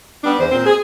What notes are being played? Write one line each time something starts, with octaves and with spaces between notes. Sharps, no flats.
G3 B3 D4
E2 C5
A#2 C4 C5
G#4